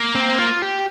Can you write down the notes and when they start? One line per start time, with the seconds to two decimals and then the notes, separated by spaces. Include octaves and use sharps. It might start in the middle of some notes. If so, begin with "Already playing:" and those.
Already playing: A#3
0.15 C4
0.39 F4
0.62 G4